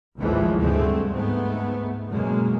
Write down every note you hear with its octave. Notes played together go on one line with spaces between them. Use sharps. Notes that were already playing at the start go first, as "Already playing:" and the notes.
A1 D#2 A2 E3 F3 G#3
D2 G2 D3 G#3 A3 C4
G#2 A3 B3
F#2 B2 G#3 A#3